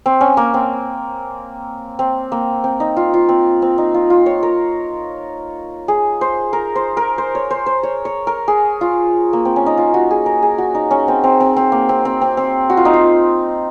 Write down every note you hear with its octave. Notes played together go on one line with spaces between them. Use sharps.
C4
C#4
A#3
C4
C4
A#3
C4
D#4
F4
F4
C4
C4
D#4
F4
F4
C#5
A#4
G#4
C5
A#4
C5
A#4
C5
C#5
C5
C5
C#5
C#5
A#4
G#4
F4
A#3
C4
C#4
D#4
F4
F#4
G#4
A#4
G#4
F#4
D#4
C#4
C4
C4
C4
C4
A#3
C4
C4
C4
C4
F#4
F4
D#4
F4